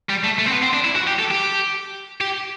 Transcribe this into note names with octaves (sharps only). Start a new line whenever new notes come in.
G3
A3
A3
C4
B3
C4
D4
E4
F#4
G4
A4
G4
G4